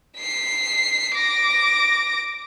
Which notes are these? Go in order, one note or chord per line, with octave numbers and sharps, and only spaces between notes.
B6 C7
D6 A#6